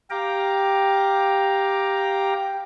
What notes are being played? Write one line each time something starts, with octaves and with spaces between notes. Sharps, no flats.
G4 F5 G5 A#5 D6